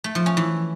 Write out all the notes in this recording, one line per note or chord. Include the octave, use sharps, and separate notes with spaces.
A3
F3
C#4
E3